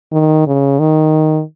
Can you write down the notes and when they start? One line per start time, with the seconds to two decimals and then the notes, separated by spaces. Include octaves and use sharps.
0.12 D#3
0.47 C#3
0.80 D#3